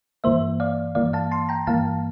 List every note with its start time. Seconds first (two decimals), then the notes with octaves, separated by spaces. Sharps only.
0.24 G2 E3 A#3 C5 E5
0.60 D5 F5
0.95 G2 E3 A#3 D5 F5
1.13 F5 A5
1.31 A5 C6
1.49 G5 A#5
1.67 G2 E3 A#3 F5 A5